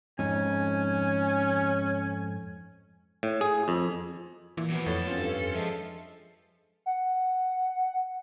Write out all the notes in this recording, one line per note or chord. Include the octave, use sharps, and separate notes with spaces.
F2 G#2 C#4 G#5
A2
G#4
F2
A#2 E3
F#3 B3 E4
F2 A2 A4 C#5
G2 C4 C#4 F4
F3 G#3 A4 E5
F#5